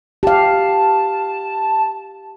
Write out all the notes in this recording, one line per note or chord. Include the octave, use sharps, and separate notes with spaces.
G4 F5 A5